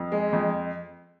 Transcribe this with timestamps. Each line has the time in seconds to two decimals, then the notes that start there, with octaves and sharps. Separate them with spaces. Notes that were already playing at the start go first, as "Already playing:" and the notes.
Already playing: F2
0.12 G#3
0.33 F2